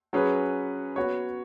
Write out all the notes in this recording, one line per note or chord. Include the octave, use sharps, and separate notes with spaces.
F#3 C#4 G#4 B4
B3 F#4 C#5